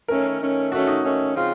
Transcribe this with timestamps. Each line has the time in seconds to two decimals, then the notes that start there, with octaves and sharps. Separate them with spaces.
0.08 D#3 A3 C#4 A#4
0.40 D#3 A3 C#4
0.72 D#3 A3 C#4 F#4
0.87 D#4
1.04 D#3 A3 C#4
1.35 C#3 F3 C4 F4